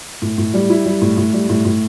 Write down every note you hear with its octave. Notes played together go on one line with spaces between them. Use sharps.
A2
A2
G3
E4
G3
A2
A2
G3
A2
A2